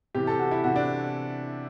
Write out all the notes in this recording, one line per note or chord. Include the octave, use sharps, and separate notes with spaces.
C3 E3 G4
A4
F#4
E4
C3 E3 F#4
D4